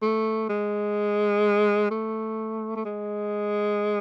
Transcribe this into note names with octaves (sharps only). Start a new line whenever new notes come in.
A3
G#3
A3
A3
G#3